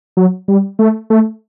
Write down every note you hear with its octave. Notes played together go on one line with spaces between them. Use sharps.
F#3
G3
A3
A3